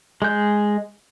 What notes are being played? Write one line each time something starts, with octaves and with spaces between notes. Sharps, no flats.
G#3 G6